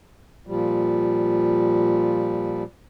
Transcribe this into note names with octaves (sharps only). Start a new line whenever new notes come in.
A#2 F3 G3